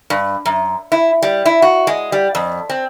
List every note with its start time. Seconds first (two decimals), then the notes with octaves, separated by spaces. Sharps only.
0.10 G2
0.45 F#2
0.92 E4
1.22 G3
1.45 E4
1.62 F#4
1.87 G#3
2.12 G3
2.35 F2
2.69 C4